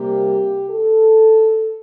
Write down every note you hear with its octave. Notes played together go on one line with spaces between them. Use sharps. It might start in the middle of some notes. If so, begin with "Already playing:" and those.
Already playing: C3 G3 A#3 G4
A4